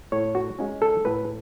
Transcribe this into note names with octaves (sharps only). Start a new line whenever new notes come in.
A2 C#5
F#4
G#3 C#4
A4
A2 B4